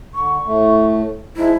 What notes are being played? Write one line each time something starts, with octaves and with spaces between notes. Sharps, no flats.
D3 C#6
A2 A3
F3 G#3 D#4 E4